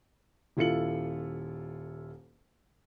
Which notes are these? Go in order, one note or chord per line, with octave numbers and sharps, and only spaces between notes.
D#1 E4 F4 A4 C#7 F#7